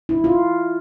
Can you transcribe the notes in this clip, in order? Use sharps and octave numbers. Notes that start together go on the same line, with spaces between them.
E4
F4